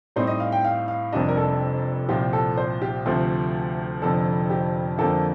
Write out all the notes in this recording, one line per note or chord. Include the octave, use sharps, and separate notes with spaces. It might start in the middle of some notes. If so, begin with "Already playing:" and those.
A2 G3 C4 D#4 C5
D#5
F5
G5
F5
F5
F1 F2 C3 G3 D4 D#5
A#4
A4
C2 A#2 F3 C4 G4
A4
C5
G4
D2 C3 F3 A3 C4
F1 F2 D3 F3 A4
G4
F2 D3 F3 A#3 A4